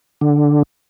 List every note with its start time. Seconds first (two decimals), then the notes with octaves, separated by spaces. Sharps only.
0.21 D3